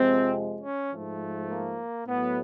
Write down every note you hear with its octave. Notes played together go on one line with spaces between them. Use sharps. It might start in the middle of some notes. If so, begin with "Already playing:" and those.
Already playing: F2 C3 F3 G#3 C4
C#4
G#2 F3 A3
A#3
A2 F#3 A3 B3